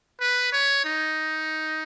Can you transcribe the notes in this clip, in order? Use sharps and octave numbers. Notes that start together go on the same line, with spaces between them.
B4
C#5
D#4